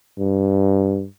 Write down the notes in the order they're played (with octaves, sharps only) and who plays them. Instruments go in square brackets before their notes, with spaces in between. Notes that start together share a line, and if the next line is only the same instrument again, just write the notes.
[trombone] G2